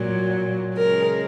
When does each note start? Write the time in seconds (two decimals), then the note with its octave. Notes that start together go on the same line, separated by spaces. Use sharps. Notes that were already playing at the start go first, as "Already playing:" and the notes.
Already playing: A#2 F#3
0.76 C#3 G#3 A#4